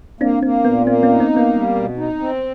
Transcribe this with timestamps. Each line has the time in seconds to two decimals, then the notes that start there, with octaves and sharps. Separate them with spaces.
0.21 A#3 C4 D4
0.43 A#3 C4
0.65 A#2 B3
0.86 A#3 C4
1.03 B3 C#4
1.09 D#4
1.20 C4
1.31 A#3
1.37 B3
1.53 G3
1.75 B2
1.97 D#4
2.19 C4